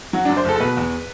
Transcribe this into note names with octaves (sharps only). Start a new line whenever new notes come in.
F#3 F#4
F#2 D4
C5
F#1 A4
A4
B2 B4
E2